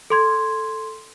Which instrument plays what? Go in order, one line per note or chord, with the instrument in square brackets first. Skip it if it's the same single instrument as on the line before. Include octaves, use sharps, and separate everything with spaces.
[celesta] A4 C6 G#6